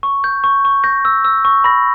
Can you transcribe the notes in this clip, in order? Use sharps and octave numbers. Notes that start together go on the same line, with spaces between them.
C#6
G6
C#6
C#6
G6 A#6
E6
E6
C#6
B5 A#6